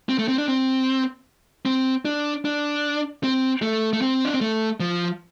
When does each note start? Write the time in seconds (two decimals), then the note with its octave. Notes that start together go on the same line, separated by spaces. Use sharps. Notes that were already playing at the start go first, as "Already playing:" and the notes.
0.09 C4
0.19 A3
0.28 C4
0.38 D4
0.48 C4
1.66 C4
2.05 D4
2.45 D4
3.23 C4
3.62 A3
3.93 A3
4.01 C4
4.25 D4
4.33 C4
4.41 A3
4.80 F3